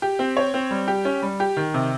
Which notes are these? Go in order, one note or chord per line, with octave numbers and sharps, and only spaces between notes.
G4
C4
C#5
C4
G3
G4
C#4
G3
G4
D#3
C3